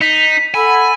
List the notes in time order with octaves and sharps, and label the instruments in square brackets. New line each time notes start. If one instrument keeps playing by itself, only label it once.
[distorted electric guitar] D#4 [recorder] B6
[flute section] A4 F#5 E6 [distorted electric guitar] G#5 [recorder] B5